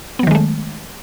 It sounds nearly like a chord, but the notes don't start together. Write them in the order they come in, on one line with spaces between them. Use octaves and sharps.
B3 F#3 D#3 G#3 A3